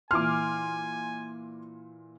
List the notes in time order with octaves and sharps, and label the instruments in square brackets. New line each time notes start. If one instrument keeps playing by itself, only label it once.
[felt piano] A#2 E3 C6 [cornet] G#5 [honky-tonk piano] D6 F6